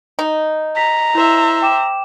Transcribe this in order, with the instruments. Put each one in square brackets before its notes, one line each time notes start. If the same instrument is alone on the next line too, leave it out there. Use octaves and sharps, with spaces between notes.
[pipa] D#4
[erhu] A#5 [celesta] B6
[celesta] E4 [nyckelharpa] C5 E5
[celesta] G5 D6 E7